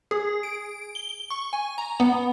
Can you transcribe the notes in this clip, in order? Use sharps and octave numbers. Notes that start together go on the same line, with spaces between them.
G#4
D7
G7
G7
C#6
G#5
A#5
B3